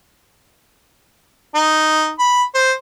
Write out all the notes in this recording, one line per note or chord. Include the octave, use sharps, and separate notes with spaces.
D#4
B5
C5